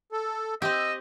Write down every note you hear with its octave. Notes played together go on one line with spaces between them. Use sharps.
A4
C4 G4 D#5 E6